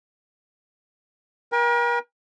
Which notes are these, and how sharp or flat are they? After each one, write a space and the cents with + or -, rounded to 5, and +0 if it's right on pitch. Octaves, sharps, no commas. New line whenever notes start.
A#4 +40 G5 +40